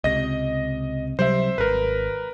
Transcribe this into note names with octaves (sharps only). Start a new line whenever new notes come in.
C#2 C3 D#5 A#6
C3 F#3 G3 C5 E5
G#1 A#4 B4